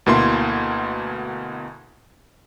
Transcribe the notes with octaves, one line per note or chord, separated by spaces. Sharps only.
D2 B2 A#3 E4 C6